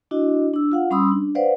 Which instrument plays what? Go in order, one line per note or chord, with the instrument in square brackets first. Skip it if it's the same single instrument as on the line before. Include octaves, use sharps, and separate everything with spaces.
[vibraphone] D4 E4 F#4 D#5
D4 E6
F4 F5 F#5
G3 C#4 B5 C6 D#6 E6
D4
B4 C5 D5 F5 F#5